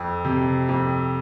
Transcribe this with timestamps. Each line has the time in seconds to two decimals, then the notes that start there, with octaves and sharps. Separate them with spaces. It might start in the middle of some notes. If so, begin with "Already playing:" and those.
Already playing: F2
0.25 C3
0.69 F2